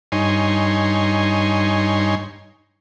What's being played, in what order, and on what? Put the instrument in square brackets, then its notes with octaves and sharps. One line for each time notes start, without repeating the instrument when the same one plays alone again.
[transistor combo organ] G2 D#4 C#5 G#5 C6